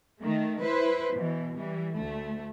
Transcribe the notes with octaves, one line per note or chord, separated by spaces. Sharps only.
D#3 A3
E4 B4 C5
B2 E3
E3 G3
D2 A3